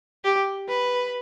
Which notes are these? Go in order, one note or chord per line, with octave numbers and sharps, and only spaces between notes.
G4
B4